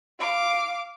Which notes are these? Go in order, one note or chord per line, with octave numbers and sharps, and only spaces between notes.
F5 D6